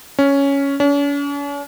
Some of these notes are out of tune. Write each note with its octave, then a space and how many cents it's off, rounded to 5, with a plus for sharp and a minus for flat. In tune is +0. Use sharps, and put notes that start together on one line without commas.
C#4 +5
C#4 +45